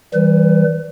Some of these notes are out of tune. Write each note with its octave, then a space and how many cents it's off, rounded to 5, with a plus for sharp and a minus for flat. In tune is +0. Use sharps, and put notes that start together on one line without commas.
E3 -30 G3 -15 B4 +35